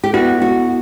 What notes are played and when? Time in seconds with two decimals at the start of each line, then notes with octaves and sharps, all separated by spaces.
0.04 G4
0.14 B3 E4 F#4 A4 D5
0.42 F#4